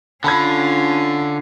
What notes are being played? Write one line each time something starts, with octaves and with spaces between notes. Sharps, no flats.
D3 C#4 F4 A5 B5 G#6